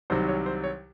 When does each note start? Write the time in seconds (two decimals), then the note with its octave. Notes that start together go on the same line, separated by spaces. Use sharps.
0.10 C2 C3 D#3 F#3 C5
0.28 C#5
0.46 C5
0.64 C#5